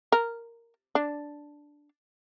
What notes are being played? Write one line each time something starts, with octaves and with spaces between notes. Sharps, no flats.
A#4
D4